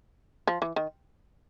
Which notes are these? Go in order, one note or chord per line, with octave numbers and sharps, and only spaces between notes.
F3
E3
D#3